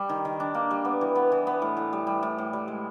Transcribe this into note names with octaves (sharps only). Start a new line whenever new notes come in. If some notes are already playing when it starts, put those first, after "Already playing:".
Already playing: G3
D#3
D#3
D4
A#3
G3
B3
E3
B3
E3
B3
A2
A2
G3
G3
A2
A2
G3
G#3